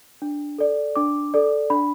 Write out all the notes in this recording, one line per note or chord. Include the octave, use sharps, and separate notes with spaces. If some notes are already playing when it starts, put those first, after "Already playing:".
D4
A4 D5
D4 D6
A4 D5
D4 B5